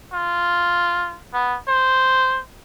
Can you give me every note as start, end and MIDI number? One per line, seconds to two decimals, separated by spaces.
0.13 1.19 65
1.34 1.57 59
1.68 2.41 72